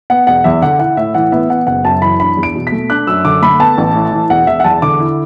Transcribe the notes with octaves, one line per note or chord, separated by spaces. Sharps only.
B3 F#5
E1 F#5
E2 E5
D3 F#5
E4 F#5
A2 E5
E3 F#5
B3 E5
B3 F#5
F#1 F#5
F#2 A5
E3 B5
D4 B5
E2
D7
B2
B6
A3
D4 F#6
F#2 E6
D3 D6
A3 B5
B3 A5
A1
A2
E3
E1 F#5
E1 E5
F#5
E2 A5
D3 D6
E4